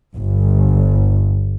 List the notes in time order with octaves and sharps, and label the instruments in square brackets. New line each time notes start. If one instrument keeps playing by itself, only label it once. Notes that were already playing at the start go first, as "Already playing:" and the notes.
[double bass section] G1